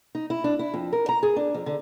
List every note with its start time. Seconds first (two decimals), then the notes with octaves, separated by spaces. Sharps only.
0.15 D#4
0.30 E4
0.44 D4
0.59 E4
0.74 F2
0.93 A#4
1.09 A#5
1.23 G#4
1.36 D4
1.54 F2
1.66 D3